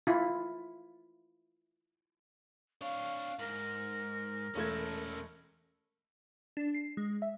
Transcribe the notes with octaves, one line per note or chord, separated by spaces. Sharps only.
E4 F4
D4 C#5 F5
G#2 A#4
E1 A3 C#4 A4 G#6
D4
C7
G#3
E5